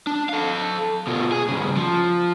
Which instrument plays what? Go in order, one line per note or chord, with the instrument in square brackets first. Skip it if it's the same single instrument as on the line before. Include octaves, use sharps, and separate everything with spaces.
[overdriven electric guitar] D4
A4 F5
B2 F4
G#4
G2 C#3
F3